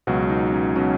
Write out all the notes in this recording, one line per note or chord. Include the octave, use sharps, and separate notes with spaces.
C#2 B2 F#3 F#4
D#4
C#4
B2 F#3 C#4